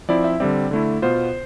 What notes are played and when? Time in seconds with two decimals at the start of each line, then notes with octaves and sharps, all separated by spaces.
0.09 F3 C4 E4 D5
0.24 E5
0.40 D3 G3 C4 D5
0.71 D3 A3 E4
1.02 B2 B3 F4 C5